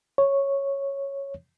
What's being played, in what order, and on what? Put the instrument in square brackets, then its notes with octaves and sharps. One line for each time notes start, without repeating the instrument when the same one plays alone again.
[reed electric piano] C#5